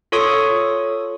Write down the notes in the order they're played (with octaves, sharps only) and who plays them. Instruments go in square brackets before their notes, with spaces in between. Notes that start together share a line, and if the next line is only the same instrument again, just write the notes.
[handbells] F4 A4 C#5 C#6 D#6